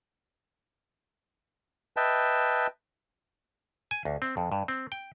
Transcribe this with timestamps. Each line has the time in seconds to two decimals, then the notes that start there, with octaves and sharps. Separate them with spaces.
1.97 B4 D#5 E5 G5 A5
3.91 G#5
4.05 D2
4.22 C4
4.37 F2
4.52 G2
4.68 C4
4.92 G5